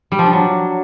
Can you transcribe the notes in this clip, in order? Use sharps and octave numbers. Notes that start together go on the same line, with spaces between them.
G3
F3
D4
F#3